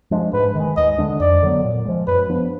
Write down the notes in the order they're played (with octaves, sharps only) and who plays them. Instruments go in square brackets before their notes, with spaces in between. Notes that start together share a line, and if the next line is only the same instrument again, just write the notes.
[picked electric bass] F3 G#3 D4
[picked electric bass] G#2 [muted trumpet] B4
[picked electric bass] D#3 G#3
[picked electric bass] D#2 [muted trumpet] D#5
[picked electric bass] D3 G#3 D4
[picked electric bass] F2 [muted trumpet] D5
[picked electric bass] D3 F#3 B3
A#2
F3 G#3
[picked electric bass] F#2 [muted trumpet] B4
[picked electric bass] F3 B3 D4